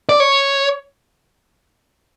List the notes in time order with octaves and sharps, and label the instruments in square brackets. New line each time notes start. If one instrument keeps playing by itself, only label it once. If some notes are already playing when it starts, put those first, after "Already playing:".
[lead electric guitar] D5
C#5